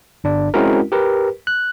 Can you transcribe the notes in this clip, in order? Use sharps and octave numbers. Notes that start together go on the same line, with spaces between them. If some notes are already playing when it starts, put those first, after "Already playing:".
G1 D4 D5
G#3 C4 C#4 E4 F#4 A#4
G4 A#4 B4
F#6